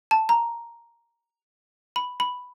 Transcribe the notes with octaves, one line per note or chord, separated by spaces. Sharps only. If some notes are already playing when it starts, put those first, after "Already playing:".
A5
A#5
B5
B5